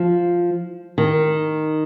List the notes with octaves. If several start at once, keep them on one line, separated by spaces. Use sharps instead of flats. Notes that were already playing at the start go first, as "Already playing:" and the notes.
Already playing: F3
D#3